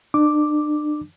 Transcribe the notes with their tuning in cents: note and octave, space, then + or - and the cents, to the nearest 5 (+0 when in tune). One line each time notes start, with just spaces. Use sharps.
D4 +35 D6 +0